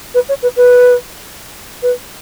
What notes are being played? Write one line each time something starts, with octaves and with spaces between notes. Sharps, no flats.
B4
C#5
B4
B4
B4